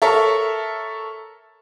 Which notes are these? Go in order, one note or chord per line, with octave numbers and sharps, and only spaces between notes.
A4 A#4 C#5 E5